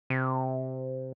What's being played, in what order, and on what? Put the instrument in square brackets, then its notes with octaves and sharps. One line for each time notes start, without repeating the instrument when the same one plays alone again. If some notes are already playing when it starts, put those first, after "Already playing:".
[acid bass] C3